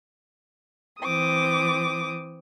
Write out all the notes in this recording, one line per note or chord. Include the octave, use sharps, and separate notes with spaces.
E3 C4 D6 D#6